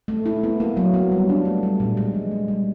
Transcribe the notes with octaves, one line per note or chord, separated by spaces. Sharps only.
A3
E4
B3
A#3
F#3
B3
G3
D4
A3
G3
A#2
G#3
F3
A#3
G3